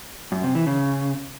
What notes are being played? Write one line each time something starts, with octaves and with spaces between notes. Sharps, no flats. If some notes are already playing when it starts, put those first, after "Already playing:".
F#2
C3
E3
C#3